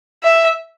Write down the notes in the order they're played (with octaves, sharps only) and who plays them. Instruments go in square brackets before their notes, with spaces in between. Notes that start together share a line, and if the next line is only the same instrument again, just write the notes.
[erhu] E5